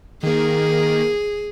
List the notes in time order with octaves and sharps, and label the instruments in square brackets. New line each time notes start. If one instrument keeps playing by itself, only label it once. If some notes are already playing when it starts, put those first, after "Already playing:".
[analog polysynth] D#3 A#3 [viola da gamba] G#4